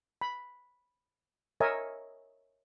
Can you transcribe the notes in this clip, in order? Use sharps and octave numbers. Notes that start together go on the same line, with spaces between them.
B5
A#4 C#5 D#5 E5 G#5